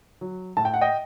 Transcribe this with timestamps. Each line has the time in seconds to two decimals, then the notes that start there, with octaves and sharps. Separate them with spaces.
0.21 F#3
0.57 A2 A5
0.65 G5
0.74 F#5
0.81 D#5 G5